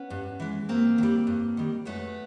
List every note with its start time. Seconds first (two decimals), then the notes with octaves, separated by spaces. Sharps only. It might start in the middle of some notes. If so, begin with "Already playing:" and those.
Already playing: B3 C#4
0.10 G2
0.40 E3 G#3
0.69 G2 A#3 C4
0.98 D#3
1.03 G3
1.27 G2
1.57 D#3 G3
1.85 F#2 A3 B3